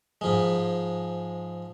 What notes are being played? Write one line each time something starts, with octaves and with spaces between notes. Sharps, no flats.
G#2 F3 G#3